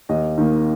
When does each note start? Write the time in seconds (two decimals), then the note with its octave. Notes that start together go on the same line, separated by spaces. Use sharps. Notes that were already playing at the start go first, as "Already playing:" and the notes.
0.09 D#2 D#5
0.38 D#3 A#3